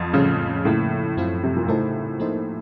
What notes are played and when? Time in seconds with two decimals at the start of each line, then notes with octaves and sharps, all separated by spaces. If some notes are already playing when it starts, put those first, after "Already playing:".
Already playing: F2
0.13 A2 C#3 A3 C4 F4
0.65 A2 C#3 F3 A#3
1.17 F#2 F3 A3 C4 F4
1.44 C3
1.56 A#2
1.68 A2 C#3 A3 D#4 A4 C5
2.19 F3 A#3 D#4 A4 C5